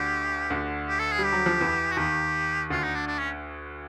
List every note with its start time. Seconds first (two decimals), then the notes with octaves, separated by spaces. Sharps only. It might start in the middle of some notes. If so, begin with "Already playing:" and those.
Already playing: D2 D3 G4
0.50 D2 D3
0.88 G4
0.99 A4
1.12 G#4
1.19 G3
1.24 G4
1.33 F#3
1.46 F3
1.61 E2 E3
1.92 F#4
1.97 D#2 D#3 G4
2.70 D2 D3 F4
2.83 D#4
2.95 D4
3.07 D4
3.19 C#4